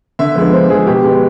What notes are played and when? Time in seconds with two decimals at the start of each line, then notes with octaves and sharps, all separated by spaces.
0.19 D3 E5
0.35 F3 G#3 B3
0.53 D3 C5
0.70 F3 G#3 B3 G#4
0.87 B2 G4
1.04 G#3 B3